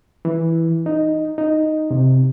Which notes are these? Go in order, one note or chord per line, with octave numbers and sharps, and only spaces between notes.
E3
D#4
D#4
C3